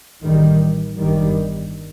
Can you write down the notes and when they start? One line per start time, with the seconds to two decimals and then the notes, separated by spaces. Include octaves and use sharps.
0.23 A1 A2 D#3 G3
0.97 G1 G2 D#3 G3